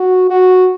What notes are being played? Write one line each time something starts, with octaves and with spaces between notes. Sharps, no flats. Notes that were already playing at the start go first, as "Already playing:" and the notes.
Already playing: F#4
F#4